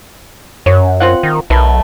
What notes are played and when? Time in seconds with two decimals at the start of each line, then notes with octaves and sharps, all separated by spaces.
0.66 F#2 C#5
1.00 C4 F4 F#5
1.23 D#3
1.50 B1 A3 A#4 B4